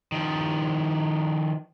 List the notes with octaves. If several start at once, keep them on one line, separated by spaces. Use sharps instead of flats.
D#3 F3